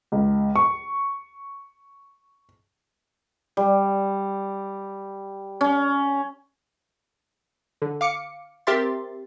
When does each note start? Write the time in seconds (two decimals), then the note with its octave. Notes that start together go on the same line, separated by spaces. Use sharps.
0.12 C#2
0.56 C#6
3.57 G3
5.61 C#4
7.82 D3
8.01 F5 D6 C#7
8.67 C4 G4 A#4 E5 C6 A6